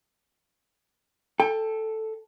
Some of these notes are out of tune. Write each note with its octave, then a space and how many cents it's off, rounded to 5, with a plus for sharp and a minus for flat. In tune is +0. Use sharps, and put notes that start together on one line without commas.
A4 +0 G5 +25